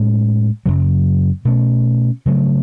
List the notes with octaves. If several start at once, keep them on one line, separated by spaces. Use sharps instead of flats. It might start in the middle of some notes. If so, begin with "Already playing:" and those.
Already playing: A2 G#3 C#4
F#2 C#3 F#3
B2 A3 C#4
C#3 F#3 A3